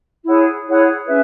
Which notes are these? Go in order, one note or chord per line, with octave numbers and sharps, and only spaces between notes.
E4 G#4 C#5 F#5
E4 G#4 C#5 F#5
C#4 G#4 B4 E5